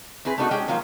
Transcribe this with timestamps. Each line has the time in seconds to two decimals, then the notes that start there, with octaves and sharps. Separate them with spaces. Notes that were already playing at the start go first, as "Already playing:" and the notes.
0.25 C4 E4 G#4 B4
0.38 A3 B3 D4 D#4 F#4 A4
0.51 G#3 C#4 G4 G5
0.68 D#3 F3 F#3 A#3 F4